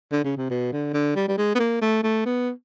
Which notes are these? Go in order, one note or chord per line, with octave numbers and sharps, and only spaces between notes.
D3
C#3
C3
B2
D3
D3
G3
G3
G#3
B3
A#3
A3
A3
B3